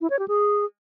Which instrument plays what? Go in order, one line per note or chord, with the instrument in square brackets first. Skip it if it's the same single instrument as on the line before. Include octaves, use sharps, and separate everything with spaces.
[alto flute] E4
C#5
G4
G#4